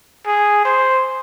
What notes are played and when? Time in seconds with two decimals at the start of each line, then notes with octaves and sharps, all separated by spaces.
0.26 G#4
0.65 C5